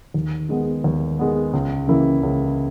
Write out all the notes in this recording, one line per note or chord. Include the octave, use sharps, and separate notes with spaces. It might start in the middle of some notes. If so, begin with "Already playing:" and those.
D#2
D#3 G#3 B3
D#2
D#3 G#3 B3
C#2
C#3 E3 A#3 E4
C#2